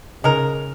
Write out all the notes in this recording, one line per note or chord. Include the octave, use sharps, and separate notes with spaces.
C#3 G#3 D#4 A#4